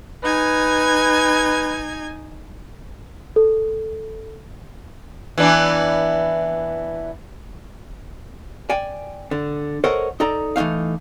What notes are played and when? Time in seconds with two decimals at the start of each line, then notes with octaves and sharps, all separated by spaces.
0.23 D#4 B4 G#5 G#6
3.36 A4
5.38 E3 B3 D4
8.70 D5 G5 G#5
9.31 D3
9.84 A4 A#4 C5 C#5 D#5 F#5
10.20 D#4 A4 D5 A#5
10.56 E3 A3 A#3 D#4 F5